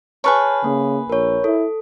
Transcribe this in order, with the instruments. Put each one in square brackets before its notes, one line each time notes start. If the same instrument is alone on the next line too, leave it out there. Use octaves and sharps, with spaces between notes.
[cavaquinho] G#4 B4 C#6 [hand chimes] C#5 A5 F6
[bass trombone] C#3 [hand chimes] A#3
[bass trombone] A#1 [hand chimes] A#4 C#5
[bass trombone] E4 [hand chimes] A4